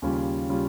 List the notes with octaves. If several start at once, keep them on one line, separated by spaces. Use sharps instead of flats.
D#2 C#3 G3 C#4 F4
C#3 G3 C#4 F4